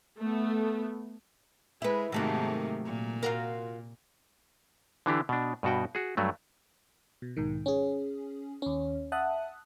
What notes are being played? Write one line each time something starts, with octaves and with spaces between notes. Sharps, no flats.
A3 B3
G#3 E4 B4
G#2 C3 D#3 F#3 A3 A#3
A#2
F4 F#4 A#4
D3 E3 D4 G4
B2 D4
G2 B2 F#4 G5
F#4 G#4
G2 F#3 A3
B2
B1 G#2 D#3
C#4 G#4
D#2 C#4
E5 F#5 A5 D#6 F#6